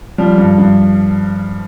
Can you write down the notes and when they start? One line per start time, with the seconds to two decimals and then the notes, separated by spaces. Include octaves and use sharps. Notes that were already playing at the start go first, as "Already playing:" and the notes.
0.18 F3 G3
0.38 G2
0.58 G2